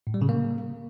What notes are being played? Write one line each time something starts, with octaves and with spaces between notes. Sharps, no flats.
A2
G3
C#3
A#3